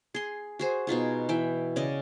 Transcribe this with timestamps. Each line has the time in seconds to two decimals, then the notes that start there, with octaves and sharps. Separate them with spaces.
0.14 G#4 C6
0.59 F#4 G#4 C5
0.87 B2 D#4 F4 G#4
1.29 E3 E5 G5
1.76 C#3 D5 D#5